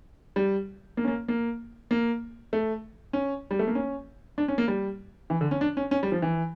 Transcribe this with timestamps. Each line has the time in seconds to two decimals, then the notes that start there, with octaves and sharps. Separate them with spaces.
0.36 G3
0.97 A#3
1.04 C#4
1.07 A#3
1.28 A#3
1.91 A#3
2.53 A3
3.13 C#4
3.51 G3
3.59 A3
3.67 A#3
3.75 C#4
4.38 D4
4.48 C#4
4.58 A#3
4.68 G3
5.30 E3
5.41 D3
5.51 C#4
5.61 D4
5.77 C#4
5.91 C#4
6.03 G3
6.12 F3
6.22 E3